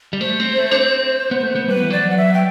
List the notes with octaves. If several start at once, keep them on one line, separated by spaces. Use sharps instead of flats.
G3
A3 C5
C4
A3
D4
C4
B3
A3
B3
G3 B4
F#3
E3
F#3 D5
F#5
E5
G5